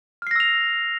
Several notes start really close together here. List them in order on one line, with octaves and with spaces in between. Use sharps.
F6 C7 A#6 E6 F7